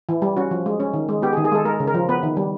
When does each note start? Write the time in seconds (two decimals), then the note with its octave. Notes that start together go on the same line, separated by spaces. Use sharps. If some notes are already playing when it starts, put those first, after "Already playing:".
0.09 E3
0.22 G3
0.37 C#4 F#4
0.51 F3
0.66 G#3
0.80 C#4
0.93 D#3
1.09 G#3
1.22 B3 G4
1.33 G#4
1.37 D#3
1.44 G#4
1.52 G#3 A4
1.65 G#3 A#4
1.80 C#3
1.87 A#4
1.94 F3
2.09 B3 B4
2.23 D#3
2.37 G3